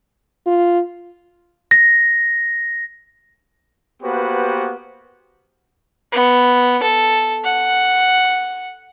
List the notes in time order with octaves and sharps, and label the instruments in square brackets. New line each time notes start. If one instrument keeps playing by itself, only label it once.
[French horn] F4
[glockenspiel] A#6
[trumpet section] A#3 B3 F#4 G4 B4 C5
[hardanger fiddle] B3
A4
F#5